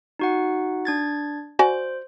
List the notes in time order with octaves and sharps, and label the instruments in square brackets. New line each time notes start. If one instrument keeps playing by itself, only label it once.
[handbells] D#4 F#4 F#5
D4 G#6 A6
[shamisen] F#4 D5 G#5 [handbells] C5